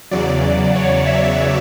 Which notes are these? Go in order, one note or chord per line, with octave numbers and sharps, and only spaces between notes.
E2 C#3 F#3 D5
C#5
C#5 E5